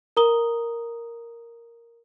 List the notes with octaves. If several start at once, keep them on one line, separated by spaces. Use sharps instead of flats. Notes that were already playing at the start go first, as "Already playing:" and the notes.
A#4 A#5 D#6 G7